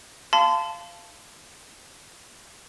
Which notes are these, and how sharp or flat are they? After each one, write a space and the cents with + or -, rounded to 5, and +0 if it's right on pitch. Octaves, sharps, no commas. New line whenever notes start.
F5 -15 A5 +0 C6 -35